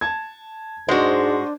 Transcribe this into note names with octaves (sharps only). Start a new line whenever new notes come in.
A5 G#6
G#2 G#3 D4 F#4 C5 D#5